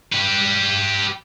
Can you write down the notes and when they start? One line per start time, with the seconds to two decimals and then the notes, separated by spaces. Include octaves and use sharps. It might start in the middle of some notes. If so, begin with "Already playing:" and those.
0.12 G4 B4